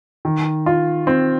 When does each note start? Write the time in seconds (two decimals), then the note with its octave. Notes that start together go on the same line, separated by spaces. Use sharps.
0.25 D#3
0.66 F4
1.07 C4